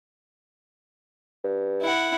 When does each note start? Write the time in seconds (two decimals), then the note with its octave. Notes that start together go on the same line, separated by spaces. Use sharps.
1.44 G2
1.82 E4 F#5